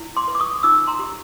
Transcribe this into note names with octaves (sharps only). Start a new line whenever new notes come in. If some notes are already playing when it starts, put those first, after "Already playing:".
Already playing: E4
C6 D6
B4
D6
C#6 D#6
D#4 D6 E6
A#5 C6
G4